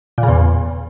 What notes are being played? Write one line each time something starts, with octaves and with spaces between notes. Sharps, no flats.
A#2
C#3
E2